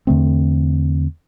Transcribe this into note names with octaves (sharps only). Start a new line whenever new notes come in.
E2 D3 A3 C4